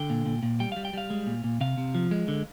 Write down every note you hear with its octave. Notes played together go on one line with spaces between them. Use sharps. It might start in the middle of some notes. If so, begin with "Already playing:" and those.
Already playing: D3 G5
A#2
A#2
A#2
G3 G5
G3 F5
G5
G3 F5
G#3
A#2
A#2
C3 F5
C3
F3
G#3
D3